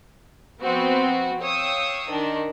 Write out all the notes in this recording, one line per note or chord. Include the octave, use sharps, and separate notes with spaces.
F3 B3 C4 F#4
C#5 F5 G5 D#6 E6
D#3 D4